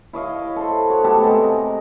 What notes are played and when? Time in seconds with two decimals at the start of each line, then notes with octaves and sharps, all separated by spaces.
0.13 E4 C#5 D#5 F5
0.56 A4 C5
0.89 F#4 C#5
1.04 A3 B3 G4 A4
1.22 C3 G#3 D#5
1.44 A#5